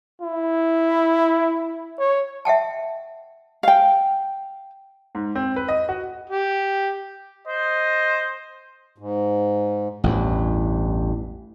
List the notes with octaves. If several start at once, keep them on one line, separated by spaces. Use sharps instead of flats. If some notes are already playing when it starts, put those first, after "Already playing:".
E4
C#5
E5 F#5 G5 A5
F5 G5
G#2
C4
B4
D#5
F#4
G4
C5 D#5
G#2
A1 E2 G2